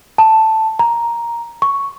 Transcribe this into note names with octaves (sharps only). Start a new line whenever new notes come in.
A5
A#5
C#6